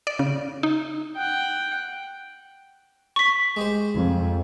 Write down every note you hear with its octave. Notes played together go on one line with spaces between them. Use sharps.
D5
C#3
D#4
F#5 G5
C#6 B6
G#3 G4 C5
F2